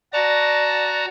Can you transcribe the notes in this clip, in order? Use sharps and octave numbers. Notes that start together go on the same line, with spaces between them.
F#4 D5 A5 A#5